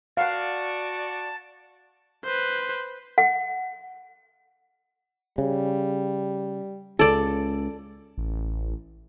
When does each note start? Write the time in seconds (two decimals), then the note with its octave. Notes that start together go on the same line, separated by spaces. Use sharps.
0.17 F#4 D5 F5 F#5 A5
2.25 B4 C5
3.18 F#5
5.38 C#3 G3
6.99 C#2 C#3 A4 D5
8.18 A1